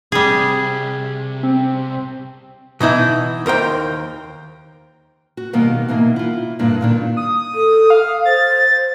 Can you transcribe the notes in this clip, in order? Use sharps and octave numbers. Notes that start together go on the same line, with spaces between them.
C2 C3 G3 G#4
C4
B2 E3 D#4 E5
D#2 A#4 C5 G5
F#4
B2 D#3 G3 A#3 B3
B2 E3 A#3 D#4
E4 F4
G2 A#2 D3 E4
A#2 D#3 D4
D#6
A4
F5
C5 A6